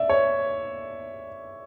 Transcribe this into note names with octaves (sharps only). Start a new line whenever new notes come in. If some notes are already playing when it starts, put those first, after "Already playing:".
Already playing: D5 E5
C#5